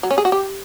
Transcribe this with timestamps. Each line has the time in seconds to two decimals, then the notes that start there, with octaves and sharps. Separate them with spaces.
0.03 F#3
0.11 C#4
0.18 G#4
0.25 F#4
0.32 G4